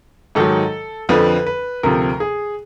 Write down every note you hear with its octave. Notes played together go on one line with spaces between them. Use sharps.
G#2 D#3 F#3 A4
F2 D3 F3 B4
B4
D2 C3 F3 A#4
G#4